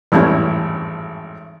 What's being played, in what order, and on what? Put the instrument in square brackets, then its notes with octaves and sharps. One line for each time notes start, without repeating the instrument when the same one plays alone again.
[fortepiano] G#1 F2 A2 [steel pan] E3 G3 C#4